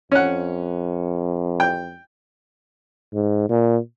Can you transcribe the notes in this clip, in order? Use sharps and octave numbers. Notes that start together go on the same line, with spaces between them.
F2 C#4 F#5
G5
G#2
A#2